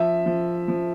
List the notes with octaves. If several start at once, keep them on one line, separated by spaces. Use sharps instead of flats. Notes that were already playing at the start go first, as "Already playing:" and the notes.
Already playing: F3 E5
F3
F3